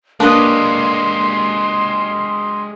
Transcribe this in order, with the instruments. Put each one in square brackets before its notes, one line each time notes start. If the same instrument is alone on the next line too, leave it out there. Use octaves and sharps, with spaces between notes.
[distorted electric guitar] G#3 G4 [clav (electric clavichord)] A#3 [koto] D4 B4 D#5 [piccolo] C6